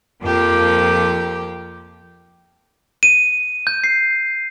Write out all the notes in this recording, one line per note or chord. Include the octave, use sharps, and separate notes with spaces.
F2 F3 A#3 G4 D6
D#7
G6
C7